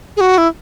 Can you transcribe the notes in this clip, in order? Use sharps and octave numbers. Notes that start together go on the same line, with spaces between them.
G#4
F#4
E4